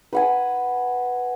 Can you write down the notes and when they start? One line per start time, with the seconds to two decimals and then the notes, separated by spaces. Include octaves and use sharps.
0.13 B4 F#5 G#5